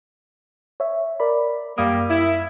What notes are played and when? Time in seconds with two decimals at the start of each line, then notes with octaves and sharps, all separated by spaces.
0.80 C#5 E5
1.20 A#4 D5 B5
1.78 F#2 G3 A#3 F5 D#6
2.10 E4